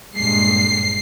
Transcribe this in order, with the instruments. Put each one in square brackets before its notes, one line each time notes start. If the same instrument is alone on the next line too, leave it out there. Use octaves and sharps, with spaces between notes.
[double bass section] G2 A#2 G#3 [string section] C7